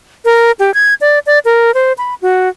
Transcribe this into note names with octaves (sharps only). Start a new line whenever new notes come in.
A#4
G4
G#6
D5
D5
A#4
C5
B5
F#4